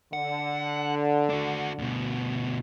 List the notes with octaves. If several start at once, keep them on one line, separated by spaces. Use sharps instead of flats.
D3 F#5
D4 F#4
D2 B2